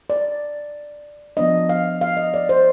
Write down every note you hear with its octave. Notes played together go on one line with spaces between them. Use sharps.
D5
F3 B3 D4 D#5
F5
F5
D#5
D5
C5